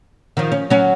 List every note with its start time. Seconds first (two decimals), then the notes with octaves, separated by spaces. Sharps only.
0.37 D#3 F3
0.52 C#4
0.70 F#3 C#4